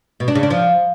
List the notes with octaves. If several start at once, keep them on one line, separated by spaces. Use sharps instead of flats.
B2
D4
C#3
D4
F3